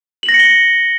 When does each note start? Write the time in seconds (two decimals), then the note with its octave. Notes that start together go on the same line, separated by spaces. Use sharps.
0.23 F#7
0.29 A#6
0.34 C#7
0.39 G7
0.45 C#7